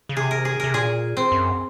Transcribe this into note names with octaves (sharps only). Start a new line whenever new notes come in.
C#3
C3 G#4
A#4
G#4
C3 A#4
A#2 G#4
C4
F#2